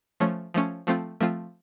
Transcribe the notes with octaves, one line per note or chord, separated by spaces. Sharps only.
F3 A3 C#4
F3 A3 C#4
F3 A3 C4 F4
F3 A3 C4 F4